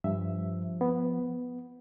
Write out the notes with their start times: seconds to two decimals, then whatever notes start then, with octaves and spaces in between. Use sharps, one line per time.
0.04 G2 F3 E5
0.81 B3